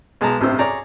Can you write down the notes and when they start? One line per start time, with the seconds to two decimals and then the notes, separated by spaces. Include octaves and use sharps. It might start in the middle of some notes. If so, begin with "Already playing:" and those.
0.21 B1 G#3 A5 A#5
0.40 A1 G2 C3 C5 E6
0.59 G#4 C#5 D5 A#5